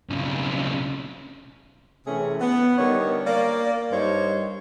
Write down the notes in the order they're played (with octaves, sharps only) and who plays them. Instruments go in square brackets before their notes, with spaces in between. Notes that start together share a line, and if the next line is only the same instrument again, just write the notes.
[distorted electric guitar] B1 C#3
[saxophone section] C3 E3 A3 C#4 G#4
B3
D3 D#3 G3 C#5
A#3 D5
G2 G3 D#4 C5 C#5